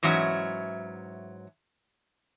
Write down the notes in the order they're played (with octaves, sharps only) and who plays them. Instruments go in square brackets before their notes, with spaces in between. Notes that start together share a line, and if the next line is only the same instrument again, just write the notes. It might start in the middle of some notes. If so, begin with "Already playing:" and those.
[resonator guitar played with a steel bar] G#2 E3 F#3 C#4 E5